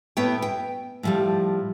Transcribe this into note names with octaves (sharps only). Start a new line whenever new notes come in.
A2 B3 C#5 G5
G5
A2 F3 G3